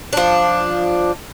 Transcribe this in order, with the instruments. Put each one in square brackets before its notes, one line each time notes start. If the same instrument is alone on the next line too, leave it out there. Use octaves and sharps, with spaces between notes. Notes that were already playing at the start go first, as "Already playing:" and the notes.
[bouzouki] F3 D4